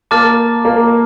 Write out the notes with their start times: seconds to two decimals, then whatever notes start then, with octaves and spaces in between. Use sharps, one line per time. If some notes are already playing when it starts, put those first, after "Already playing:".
0.11 A#3 A5 D6 F6 A6
0.65 A#3